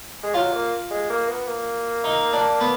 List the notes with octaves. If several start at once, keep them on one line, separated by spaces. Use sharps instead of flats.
G#3
F#3 F4
A#3
G#3
A#3
B3
A#3
D#4
D4
B3